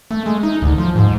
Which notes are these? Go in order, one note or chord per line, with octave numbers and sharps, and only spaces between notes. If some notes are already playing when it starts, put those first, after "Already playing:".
A3
G#3
D#4
D2
F3
G#2